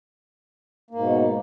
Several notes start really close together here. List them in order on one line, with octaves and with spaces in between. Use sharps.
A#3 G#2 B2